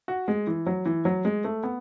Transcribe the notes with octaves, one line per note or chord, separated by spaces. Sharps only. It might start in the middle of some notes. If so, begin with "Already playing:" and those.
F#4
G#3
E3
F#3
E3
F#3
G#3
A3
B3